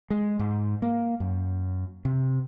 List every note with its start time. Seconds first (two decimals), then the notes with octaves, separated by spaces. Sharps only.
0.10 G#3
0.39 G#2
0.82 A#3
1.20 F#2
2.05 C3